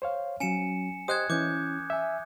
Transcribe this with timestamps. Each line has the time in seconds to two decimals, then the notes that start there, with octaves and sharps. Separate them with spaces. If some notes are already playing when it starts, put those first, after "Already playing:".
0.02 C5 C#5 F5
0.40 F#3 C#4 G#5 C#7 E7
1.08 G4 C5 D#5 D#6 F#6 G#6
1.30 E3 C#4 D6 G6
1.90 E5 G#5